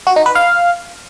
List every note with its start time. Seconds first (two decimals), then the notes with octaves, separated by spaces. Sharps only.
0.07 F#4
0.16 D#4
0.26 B4
0.35 F5